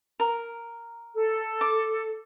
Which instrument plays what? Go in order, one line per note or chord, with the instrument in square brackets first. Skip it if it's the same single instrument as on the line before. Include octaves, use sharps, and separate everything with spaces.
[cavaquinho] A#4
[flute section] A4
[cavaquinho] D6